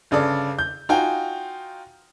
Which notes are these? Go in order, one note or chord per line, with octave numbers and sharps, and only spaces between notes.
G1 C#3 A4 D5 D6
G6
D#4 F4 F#4 G5 G#5